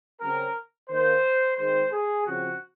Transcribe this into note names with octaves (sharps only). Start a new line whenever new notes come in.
C#3 F#3 C4 A#4
D#3 A#3 C5
D#3 G#3 C4 C5
G#4
C#3 F3 C4 F#4